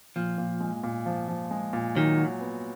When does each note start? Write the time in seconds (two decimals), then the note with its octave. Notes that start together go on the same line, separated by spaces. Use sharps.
0.16 A#2 F3
0.38 A#2
0.60 G#3
0.84 A#2
1.06 F3
1.28 F3
1.51 G#3
1.73 A#2
1.96 D#3 F#3
2.18 F#4
2.41 B3